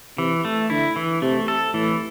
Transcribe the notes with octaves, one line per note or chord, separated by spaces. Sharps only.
C3 E3
A3
D3 E4
E3
C3 A3
A4
A2 E3